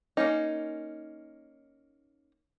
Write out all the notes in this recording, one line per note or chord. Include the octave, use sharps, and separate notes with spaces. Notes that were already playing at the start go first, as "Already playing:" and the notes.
A#3 C#4 D#4